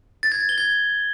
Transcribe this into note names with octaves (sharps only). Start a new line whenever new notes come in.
A6
G#6
A6
G7
G#6